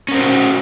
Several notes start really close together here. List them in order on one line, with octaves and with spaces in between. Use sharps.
C#4 A#4 C5 F#4